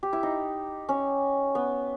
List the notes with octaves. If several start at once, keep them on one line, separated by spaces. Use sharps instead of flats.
G4
E4
D#4
C#4
B3